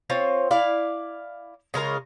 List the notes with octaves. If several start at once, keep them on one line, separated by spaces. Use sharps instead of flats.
C4 F4 C#5
E4 D5 F5
C#3 G#3 F4 A#4